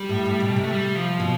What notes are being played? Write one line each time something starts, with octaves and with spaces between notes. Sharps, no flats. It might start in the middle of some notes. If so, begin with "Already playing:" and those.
Already playing: G3
A2
A2
B2
C3
A3
G3
F3
B2